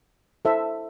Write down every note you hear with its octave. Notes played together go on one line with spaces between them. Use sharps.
E4 A4 C5 E5